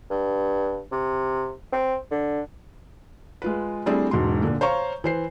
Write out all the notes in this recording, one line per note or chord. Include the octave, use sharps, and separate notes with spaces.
G2
C3
C4
D3
G#3 F4 B4
G3 A3 C4 D4 E4 G#4
E1 G#2 F#3 C6
A#2 D3
C5 C#5 F5 A#5 C#6
E3 C5 C7